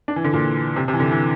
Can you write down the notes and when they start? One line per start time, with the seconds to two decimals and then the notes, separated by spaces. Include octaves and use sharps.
0.08 D4
0.16 E3
0.24 D3
0.34 A#2
0.76 C3
0.88 C3
0.94 E3
1.00 D3
1.11 E3